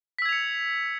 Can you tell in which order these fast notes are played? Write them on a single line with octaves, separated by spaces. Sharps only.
B6 E6 G#6 F7 C#7